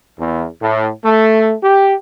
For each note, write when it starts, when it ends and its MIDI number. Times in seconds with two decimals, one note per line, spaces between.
0.19 0.46 40
0.62 0.90 45
1.05 1.54 57
1.63 1.95 67